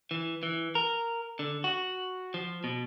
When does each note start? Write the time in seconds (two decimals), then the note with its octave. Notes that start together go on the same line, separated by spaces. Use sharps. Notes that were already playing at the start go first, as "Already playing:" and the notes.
0.11 E3
0.43 E3
0.75 A#4
1.39 D3
1.64 F#4
2.34 F3
2.64 B2